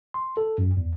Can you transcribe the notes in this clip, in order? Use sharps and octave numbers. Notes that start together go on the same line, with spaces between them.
C6
A4
F#2
E2